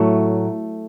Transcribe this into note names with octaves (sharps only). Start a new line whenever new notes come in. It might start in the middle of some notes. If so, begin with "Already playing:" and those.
Already playing: A2 F#3 A3